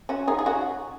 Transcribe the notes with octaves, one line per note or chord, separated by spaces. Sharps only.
C#4 F#4
D#4 G#4
G#4
C#4 F#4